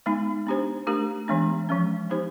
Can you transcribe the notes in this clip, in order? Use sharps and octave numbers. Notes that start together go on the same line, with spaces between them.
G#3 B3 D#4
B3 D4 G4 C5
A3 D4 G4 A#4
E3 G#3 B3 D4
F3 G#3 C#4
B3 D#4 G4 C5